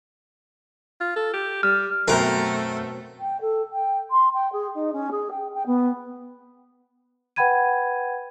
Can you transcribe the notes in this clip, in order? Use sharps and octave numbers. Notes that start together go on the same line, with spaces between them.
F4
A4
G4
G3 F6
F#2 B2 F#3 A3 C4 A#4 A#5
G5
A4
G5
C6
G5
G#4
D#4
C#4
G#4
G5
G5
B3
B4 F#5 G5 B5 G#6 D#7